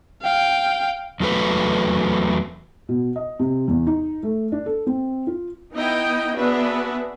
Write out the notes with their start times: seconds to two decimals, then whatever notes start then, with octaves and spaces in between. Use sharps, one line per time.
0.22 F5 G5
1.20 E2 F#3 A3 B4
2.89 B2
3.16 D#5
3.39 C3
3.68 E2
3.87 D#4
4.23 A3
4.52 D4
4.66 A4
4.87 C4
5.27 F4
5.74 B3 D#4 E4 D#5 G5
6.36 B3 D4 F#4 G#4 B4 E5